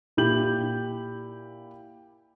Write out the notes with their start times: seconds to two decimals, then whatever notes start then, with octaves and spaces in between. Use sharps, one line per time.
0.17 A#2 E4 G4 G6 F#7